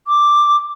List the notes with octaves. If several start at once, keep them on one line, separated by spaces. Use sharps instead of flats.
D6